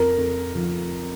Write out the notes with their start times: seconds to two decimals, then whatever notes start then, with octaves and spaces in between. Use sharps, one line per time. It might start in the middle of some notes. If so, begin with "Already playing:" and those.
Already playing: F2 A#4
0.18 F2
0.55 F3